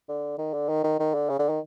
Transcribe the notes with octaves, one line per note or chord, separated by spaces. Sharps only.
D3
D#3
D3
D#3
D#3
D#3
D3
C#3
D3
D#3